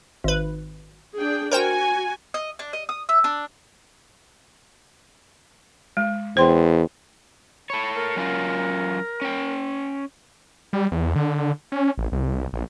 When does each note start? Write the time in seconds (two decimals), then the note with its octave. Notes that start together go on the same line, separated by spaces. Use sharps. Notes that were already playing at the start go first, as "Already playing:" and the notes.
0.24 G#1 B4
1.18 D4 G#4 G5
1.51 F#4 A#4 C5 G5 G#5
2.34 D#5
2.59 D4
2.73 D#5
2.89 D#6
3.09 E5
3.24 D4
5.97 G#3
6.37 E2 C5 G5 C6
7.70 A4 C#5 B5
7.94 A#4
8.16 F#3 C#4 F4
9.22 C#4 G5
10.73 G3
10.92 E2
11.16 D3
11.72 C#4
11.98 A1
12.12 C2
12.53 A#1